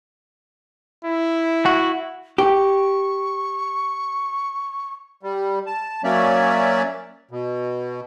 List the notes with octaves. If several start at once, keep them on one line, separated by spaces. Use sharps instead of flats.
E4
F#4
G4 C#6
G3
A5
F#3 A#3 C#4 C#5 D5 E5
B2